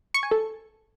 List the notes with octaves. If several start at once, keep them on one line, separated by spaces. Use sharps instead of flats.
C#6
G#5
A4